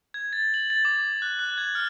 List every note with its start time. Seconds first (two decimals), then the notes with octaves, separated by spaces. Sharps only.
0.14 G#6
0.33 A6
0.54 F#7
0.70 A6
0.85 D6
1.22 F#6
1.39 F#6
1.58 G#6
1.75 F6